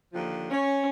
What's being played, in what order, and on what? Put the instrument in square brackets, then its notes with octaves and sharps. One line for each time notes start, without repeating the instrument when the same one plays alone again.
[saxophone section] D#2 D3 F3
[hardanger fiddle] C#4 [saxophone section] C#5